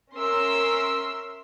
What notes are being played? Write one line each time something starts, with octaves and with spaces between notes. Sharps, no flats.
C#4 A#4 E5 C6 E6